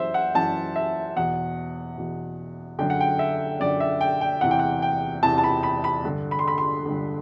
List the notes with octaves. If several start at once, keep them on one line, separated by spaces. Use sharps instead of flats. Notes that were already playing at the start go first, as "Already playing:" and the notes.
Already playing: F#2 E3 C5 E5
F#5
F#2 E3 A5
E5
E2 B2 F#5
E2 B2
F#2 D3 G5
F#5
G5
E5
F#2 D3 D5
E5
G5
G5
E2 C3 E3 F#5
G5
F#5
G5
E2 C3 E3 A5
A5
B5
B5
B5
G2 D3
B5
C6
B5
C6
G2 D3